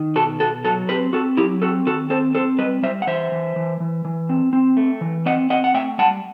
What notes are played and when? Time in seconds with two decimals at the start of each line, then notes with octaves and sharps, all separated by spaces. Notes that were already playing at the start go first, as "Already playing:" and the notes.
Already playing: D#3
0.16 B2 F#4 A4
0.40 B2 F#4 A4
0.65 F#3 F#4 A4
0.89 C4 G4 B4
1.13 C4 F#4 A4
1.37 F#3 E4 G4
1.62 C4 F#4 A4
1.86 D#3 F#4 A4
2.10 C4 A4 C5
2.35 C4 A4 C5
2.58 G3 B4 D#5
2.83 G3 C5 E5
3.02 F#5
3.07 E3 C5 E5
3.32 E3
3.56 E3
3.80 E3
4.05 E3
4.29 C4
4.53 C4
4.77 A3
5.01 E3
5.26 C4 D#5 F#5
5.50 C4 D#5 F#5
5.64 F#5
5.74 A3 E5 G5
5.98 G3 F#5 A5